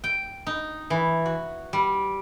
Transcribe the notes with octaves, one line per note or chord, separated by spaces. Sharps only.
G5
D#4
E3
F#4
G3